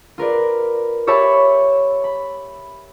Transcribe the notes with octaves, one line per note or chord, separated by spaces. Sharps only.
F4 A#4 B4 D5
G4 C#5 E5 A5 B5 C#6
B5